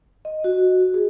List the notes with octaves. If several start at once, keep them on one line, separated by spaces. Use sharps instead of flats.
D#5
F#4
G#4